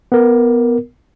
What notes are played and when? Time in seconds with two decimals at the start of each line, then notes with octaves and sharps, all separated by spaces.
0.12 B3 A#4